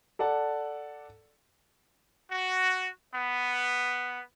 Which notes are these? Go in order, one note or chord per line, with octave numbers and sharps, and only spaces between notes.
A4 D5 F#5 A5
F#4
B3